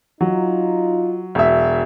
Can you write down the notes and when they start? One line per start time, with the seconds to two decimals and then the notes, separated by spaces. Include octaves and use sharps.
0.21 F#3 D#4 F4
1.35 E1 E5